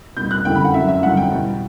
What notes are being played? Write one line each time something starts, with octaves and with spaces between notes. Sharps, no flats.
B2 G3 G6
F#6
F#2 D3 G3 G5
B5
F#5
F#2 F#3 E5
E5
G2 D3 F#3 F#5
G5
E2 B2 G3